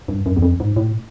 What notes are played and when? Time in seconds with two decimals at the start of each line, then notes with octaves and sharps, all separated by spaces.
0.08 G2
0.26 F#2
0.36 E2
0.42 F2
0.60 G#2
0.76 A2